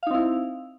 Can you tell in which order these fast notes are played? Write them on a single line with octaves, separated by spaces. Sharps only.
F5 D#4 C4 E4